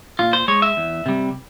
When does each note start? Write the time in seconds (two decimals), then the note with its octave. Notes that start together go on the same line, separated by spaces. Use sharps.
0.19 A#2 F4
0.33 C5
0.48 G#3 C#5
0.62 E5
0.77 E2
1.06 C3 G3